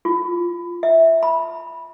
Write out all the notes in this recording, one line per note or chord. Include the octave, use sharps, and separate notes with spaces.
F4
E5
B5